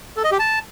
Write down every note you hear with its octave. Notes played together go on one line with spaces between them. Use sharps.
A4
D#5
G4
A5